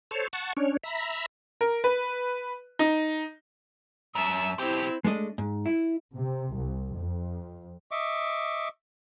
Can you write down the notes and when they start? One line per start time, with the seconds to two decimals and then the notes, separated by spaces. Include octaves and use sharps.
0.11 A4 C5 C#5
0.33 F#5 A5 C#6
0.57 C#4 D4 C#5
0.83 E5 A#5 B5
1.61 A#4
1.84 B4
2.79 D#4
4.15 F#2 E5 A5
4.58 B1 C4 E4 G4
5.04 G#3 A3 D4 D#5
5.38 G#2
5.66 E4
6.16 C3
6.56 C2
6.96 F2
7.91 D#5 E5 C#6 D6